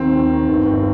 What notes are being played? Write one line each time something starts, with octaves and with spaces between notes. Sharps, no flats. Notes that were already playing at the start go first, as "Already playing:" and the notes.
Already playing: D#2 D#3 C4
D#2
D#3
G1
G1